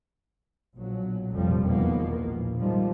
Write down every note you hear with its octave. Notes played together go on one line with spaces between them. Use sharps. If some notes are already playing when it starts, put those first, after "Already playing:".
A#1 B2 F#3
F1 A#1 F2 F3 G3
E2 B2 D#3 F3 A#3 B3
A#1
G#2 D#3 F3 G3